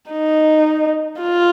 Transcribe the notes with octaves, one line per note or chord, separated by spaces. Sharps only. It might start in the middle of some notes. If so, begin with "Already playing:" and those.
D#4
F4